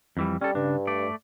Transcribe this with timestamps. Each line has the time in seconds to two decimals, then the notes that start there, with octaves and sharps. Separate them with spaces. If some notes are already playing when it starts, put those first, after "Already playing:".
0.17 F2 E3 G3
0.41 G3 C#4 A4
0.55 G2 C#3 D4
0.87 A3 D5